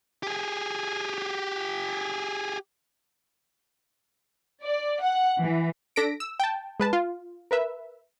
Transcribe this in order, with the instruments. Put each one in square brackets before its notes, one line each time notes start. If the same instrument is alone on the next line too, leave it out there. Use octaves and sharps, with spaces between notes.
[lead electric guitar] G4 G#4
[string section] D5
F#5
E3
[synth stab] D4 A4 A#6 B6 D7
E6
G5 A5
G#3 B4 A5
F4
A#4 B4 E5